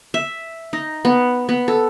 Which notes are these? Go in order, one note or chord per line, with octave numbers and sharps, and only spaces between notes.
E5
D#4
B3
B3
A4